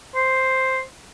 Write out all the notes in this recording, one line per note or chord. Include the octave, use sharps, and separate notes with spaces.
C5